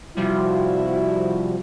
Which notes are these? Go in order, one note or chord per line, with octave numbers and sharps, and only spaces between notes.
C3 F3 G3 E4 F#4